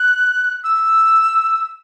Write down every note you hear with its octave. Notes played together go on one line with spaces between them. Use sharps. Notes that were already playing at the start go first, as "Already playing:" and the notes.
Already playing: F#6
E6